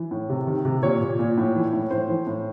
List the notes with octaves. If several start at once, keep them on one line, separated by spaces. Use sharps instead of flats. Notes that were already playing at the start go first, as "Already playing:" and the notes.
Already playing: E3
A2
C3
D#3
C3
A#2 C#5
A#2
A#2
A2
E3
A2
A2 C5
E3
A2